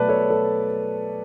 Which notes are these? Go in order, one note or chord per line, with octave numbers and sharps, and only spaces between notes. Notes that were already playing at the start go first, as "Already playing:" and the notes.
Already playing: B2 F#3 A3 B4 D5 A5
A4 C#5
A4